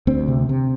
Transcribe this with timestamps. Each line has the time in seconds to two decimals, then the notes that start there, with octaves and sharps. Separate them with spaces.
0.07 D2 C4
0.28 C3
0.49 C3